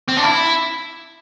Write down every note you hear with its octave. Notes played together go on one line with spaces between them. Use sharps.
C4
D4
E4